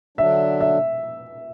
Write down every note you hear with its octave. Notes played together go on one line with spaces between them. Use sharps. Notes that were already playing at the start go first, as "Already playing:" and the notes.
D3 F#3 D4 E5
E5